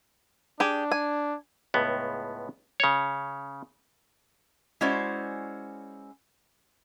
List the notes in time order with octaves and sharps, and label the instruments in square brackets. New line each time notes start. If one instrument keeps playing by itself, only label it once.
[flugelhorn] D4 [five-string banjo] G4 G#4
[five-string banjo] G#5
[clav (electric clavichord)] C#2 A2 B3
C#3 C#5
[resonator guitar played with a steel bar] G#3 C#4 E4 F#4 C5 D5